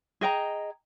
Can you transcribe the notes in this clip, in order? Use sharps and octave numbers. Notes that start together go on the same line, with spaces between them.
G#4 D#5 G5 A#5